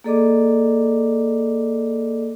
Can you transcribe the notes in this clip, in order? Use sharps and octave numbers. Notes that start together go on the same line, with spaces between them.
A#3 G#4 A4 D5 D#5 D6